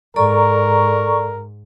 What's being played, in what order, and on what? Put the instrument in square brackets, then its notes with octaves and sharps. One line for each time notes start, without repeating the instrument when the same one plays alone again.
[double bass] G#2 [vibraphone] A4 D5 A#5 [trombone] A#4 [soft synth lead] C#6